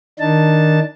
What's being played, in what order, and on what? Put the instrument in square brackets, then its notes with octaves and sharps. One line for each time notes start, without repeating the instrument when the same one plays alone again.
[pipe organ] D#3 D4 D#4 A5